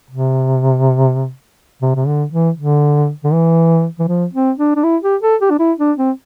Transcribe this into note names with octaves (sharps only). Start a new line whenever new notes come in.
C3
C3
C3
D3
E3
D3
D3
E3
E3
F3
C4
D4
D4
E4
G4
A4
G4
D4
E4
D4
C4